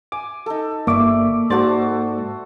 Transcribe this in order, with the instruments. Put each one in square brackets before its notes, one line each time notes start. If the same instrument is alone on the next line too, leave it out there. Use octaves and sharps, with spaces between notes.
[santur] G#5 [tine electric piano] D6
[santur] D#4 A4
[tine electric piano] G1 [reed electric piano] A#3 D6 [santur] D5 E5 C#6
[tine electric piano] G#2 D5 A6 [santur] F#4 A4 C5